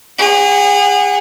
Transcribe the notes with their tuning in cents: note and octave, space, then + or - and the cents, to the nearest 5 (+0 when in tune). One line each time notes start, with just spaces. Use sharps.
G#4 -35 F#5 +0